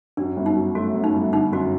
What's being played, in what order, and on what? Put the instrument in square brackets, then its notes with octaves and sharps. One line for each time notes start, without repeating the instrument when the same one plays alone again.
[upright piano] F#2 [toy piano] D4
[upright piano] G1
[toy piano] D#4
[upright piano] F#3
[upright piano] A3 [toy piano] F#4
[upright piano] F#2
[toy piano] D#4
[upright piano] G1
[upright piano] D3 [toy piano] D#4
[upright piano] F#2 [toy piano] F#4